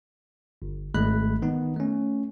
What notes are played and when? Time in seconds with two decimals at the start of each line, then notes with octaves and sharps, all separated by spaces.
0.62 G1
0.94 G#1 G#3 A3 B5 F#6
1.42 D#3 B3 D#4
1.76 A3 C#4